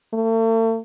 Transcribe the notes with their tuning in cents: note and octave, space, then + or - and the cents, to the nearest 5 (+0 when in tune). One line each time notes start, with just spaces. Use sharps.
A3 +40